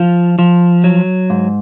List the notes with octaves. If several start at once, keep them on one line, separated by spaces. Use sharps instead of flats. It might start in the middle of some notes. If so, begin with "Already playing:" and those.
Already playing: F3 F4
F3
F#3
G#2